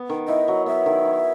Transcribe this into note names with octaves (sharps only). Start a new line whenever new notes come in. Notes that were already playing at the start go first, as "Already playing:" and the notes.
Already playing: B3
D#3
E4 D#5
F#3
B3 E5
D#3
E4